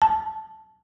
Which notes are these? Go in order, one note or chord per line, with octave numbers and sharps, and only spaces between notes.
A5